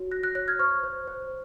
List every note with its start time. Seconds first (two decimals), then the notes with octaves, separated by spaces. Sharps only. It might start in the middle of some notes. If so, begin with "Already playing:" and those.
Already playing: F#4 C#5
0.11 F#4 F#6 A#6
0.23 F#6 A#6
0.35 C#5 F#6 A#6
0.48 F6 G#6
0.59 C5 C#6 F6
0.83 C5
1.08 C5